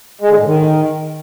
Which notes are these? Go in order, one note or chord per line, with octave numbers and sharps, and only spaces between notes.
G#3
D3
A2
D#3